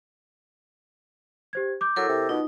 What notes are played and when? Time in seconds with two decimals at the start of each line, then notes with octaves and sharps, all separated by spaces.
1.53 G4 C5 G#6
1.81 D6 G6
1.96 F#3 E4 A4 A#4
2.09 C3
2.29 B2 D#4 F4